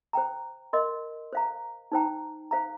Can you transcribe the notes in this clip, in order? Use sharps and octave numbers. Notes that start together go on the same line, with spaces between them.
C5 G5 A#5
A#4 D#5 C6
C5 F5 A#5
D#4 C5 G5 A#5
C5 F5 A#5